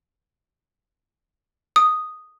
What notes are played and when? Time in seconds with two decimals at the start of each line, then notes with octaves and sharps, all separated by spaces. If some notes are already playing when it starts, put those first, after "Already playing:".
1.76 D#6